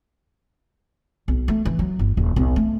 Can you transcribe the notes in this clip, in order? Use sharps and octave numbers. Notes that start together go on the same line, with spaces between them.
B1
A3
E3
F#3
G1
D#1
B1
A3